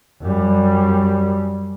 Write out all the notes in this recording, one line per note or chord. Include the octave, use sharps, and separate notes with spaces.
F#2 G3